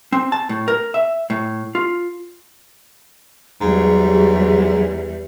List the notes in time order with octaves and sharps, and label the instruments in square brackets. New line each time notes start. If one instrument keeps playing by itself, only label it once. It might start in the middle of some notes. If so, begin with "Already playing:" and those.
[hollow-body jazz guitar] C4
A5
A2
A#4
E5
A2
F4
[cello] E2 G3 [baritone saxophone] G#2 [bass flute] F#3 [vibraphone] G4 G#4